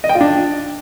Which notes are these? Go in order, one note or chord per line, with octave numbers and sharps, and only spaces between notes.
D#5
G5
F4
D4